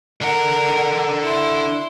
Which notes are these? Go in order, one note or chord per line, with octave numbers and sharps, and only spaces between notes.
D3 A#4 F#5
E4 C6